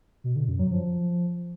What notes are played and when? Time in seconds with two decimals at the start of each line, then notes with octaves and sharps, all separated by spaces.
0.24 B2
0.36 D3
0.48 F#2
0.59 F#3
0.71 F3